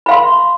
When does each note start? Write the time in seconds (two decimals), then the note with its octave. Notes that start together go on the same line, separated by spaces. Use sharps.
0.06 B5
0.09 F5
0.11 C6